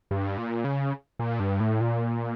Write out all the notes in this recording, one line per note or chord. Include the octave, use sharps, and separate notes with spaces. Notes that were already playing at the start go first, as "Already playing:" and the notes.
G2
A#2
C#3
A#2
G2
A2
A#2